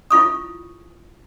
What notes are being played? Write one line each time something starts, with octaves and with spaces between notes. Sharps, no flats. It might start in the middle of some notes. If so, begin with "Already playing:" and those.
E4 F4 C#6 D#6